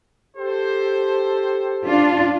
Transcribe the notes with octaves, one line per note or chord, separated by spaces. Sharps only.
G4 A4 C5
D4 F4